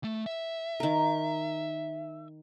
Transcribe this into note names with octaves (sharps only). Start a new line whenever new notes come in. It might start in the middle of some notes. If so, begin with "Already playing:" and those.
A3
E5
D#3 A#4